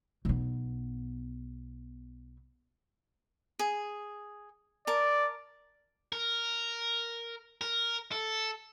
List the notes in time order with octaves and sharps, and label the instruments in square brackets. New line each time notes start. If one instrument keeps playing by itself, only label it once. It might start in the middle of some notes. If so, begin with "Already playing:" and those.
[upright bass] B1 B3
[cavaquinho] G#4
[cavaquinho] A#4 A5 [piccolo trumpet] D5
[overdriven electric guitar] A#4
A#4
A4